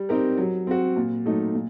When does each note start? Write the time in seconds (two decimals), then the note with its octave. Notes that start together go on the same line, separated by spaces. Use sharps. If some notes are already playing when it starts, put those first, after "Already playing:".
Already playing: G3
0.09 C4 D#4 G4 A#4
0.38 F#3
0.67 C4 F#4
0.96 A#2
1.26 F#3 A3 D#4
1.54 A#2